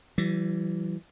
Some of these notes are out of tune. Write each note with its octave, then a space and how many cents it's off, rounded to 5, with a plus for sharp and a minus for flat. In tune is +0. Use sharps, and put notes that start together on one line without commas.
E3 +15 G3 -40